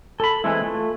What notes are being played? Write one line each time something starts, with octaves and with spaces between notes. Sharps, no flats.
A4 B5
E3 G#3 A3 C4 E4
A3 F4